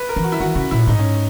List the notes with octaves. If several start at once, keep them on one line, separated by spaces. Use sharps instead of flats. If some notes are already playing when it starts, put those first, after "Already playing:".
Already playing: B4
A#4
E3
F#4
E4
D#3 F#4
C#3 F#4
A#2 E4
G#2 D#4
C#4